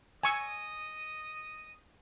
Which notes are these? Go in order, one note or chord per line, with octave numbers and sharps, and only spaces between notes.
D#5 G#5 C#6 D#6 E6